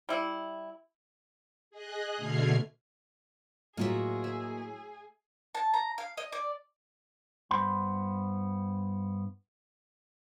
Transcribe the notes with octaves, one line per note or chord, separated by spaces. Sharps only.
G3 E4
G#4 D#5 F#6
B2 D3 A3 F6 G#6 C7
A2 F#3 A#3 F4 F#4 G#4 D#5 E5
E5
A5
A#5
F5
D#5
D5
G2 B3 C5 B5 C6